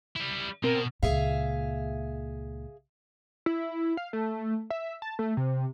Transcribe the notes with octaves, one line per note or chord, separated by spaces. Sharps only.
G3 E4
B2 C4 A#4
C#2 A#2 G#4 E5 F5
E4
F5
A3
E5
A5
A3
C3